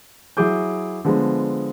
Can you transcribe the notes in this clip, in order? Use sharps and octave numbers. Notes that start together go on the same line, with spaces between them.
F#3 E4 G#4 D6 G6
D3 F3 G#3 B3